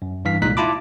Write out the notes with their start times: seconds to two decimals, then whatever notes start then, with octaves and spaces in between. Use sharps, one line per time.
0.02 F#2
0.25 G2 E3 F5 B6
0.42 C2 A#2 G#3 D#4 F#6 B6
0.57 E4 F4 A5 B5 D6